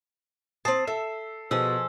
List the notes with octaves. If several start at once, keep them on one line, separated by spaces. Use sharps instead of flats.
C4 A5 D#6 C7
A4 E5
B2 F3 G#4 A4 E6